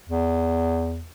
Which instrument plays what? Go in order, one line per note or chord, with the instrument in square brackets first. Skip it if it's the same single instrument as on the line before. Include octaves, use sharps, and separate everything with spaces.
[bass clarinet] E2